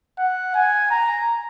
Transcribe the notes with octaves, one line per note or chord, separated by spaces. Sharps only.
F#5
G#5
A#5